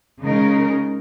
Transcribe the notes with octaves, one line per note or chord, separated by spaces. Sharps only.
C#3 G#3 D#4 A#4